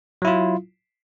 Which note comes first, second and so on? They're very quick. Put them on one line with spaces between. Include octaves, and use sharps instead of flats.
F#3 E4 F4